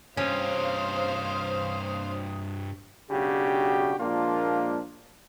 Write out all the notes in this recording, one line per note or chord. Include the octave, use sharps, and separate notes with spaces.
G2 C3 C#4 C5 F5 D#6
B1 C#3 D4 F#4 G4
A#2 F3 G#3 A#3 D4 F4